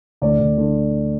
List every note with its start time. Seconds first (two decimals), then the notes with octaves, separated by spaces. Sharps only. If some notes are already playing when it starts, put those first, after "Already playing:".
0.22 D2 D5
0.40 D2
0.58 D3